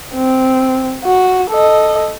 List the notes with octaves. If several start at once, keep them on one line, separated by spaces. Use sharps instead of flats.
C4
F#4
A4 D#5